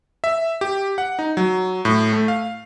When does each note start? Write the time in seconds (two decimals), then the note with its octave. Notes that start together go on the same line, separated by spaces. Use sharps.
0.24 E5
0.61 G4
0.98 F#5
1.19 D#4
1.37 F#3
1.85 A2
2.13 A3
2.28 F5